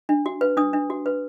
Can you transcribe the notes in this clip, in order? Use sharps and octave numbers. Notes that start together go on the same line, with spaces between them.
D4
F#4
B4
D4 D#6
D4
F#4
B4